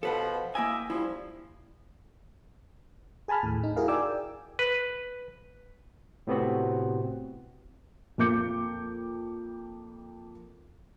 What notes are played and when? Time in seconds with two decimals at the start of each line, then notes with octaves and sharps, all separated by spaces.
0.03 B2 F3 A4 B4 F#5
0.55 A#3 E4 D#5 E5 G5 G#5
0.90 G2 F3 G3 E4
3.28 G#4 G#5 A5 B5 F6
3.43 D#2 A2
3.63 D#4
3.76 E4 F#4 G#4 A#4 F5
3.88 D5 G5 G#5 D6 E6
4.59 B4
6.27 A2 C3 B3 C4 F#4
8.18 F2 A#3 D6 G6 C#7